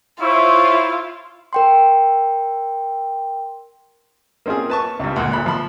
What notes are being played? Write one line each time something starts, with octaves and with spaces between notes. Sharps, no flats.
E4 F4 C5 C#5 E5
A#4 G5 C6
A#3 C4 C#4 F4 G#4
B4 A5 C#6
C#2 G2
D2 A#2
G#1 B5 F#6
F3 B5 C6